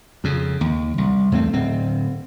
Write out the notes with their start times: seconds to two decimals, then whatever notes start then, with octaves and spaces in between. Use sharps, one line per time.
0.24 F2 C#3
0.61 D#2
0.98 C2
1.32 E2 A3 C4
1.53 D1 C4